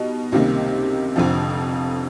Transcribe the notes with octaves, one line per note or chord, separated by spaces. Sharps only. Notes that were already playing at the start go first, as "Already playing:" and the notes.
Already playing: B2 G3 D#4
C#2 C3 D#3 G3 A#3
F1 F2 D3 F3